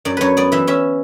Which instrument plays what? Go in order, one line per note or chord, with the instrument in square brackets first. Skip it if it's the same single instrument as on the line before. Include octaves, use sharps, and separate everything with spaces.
[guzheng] F#2 D5
F#2 B4 C#5
B3 D5
E3 E5
C#4 E5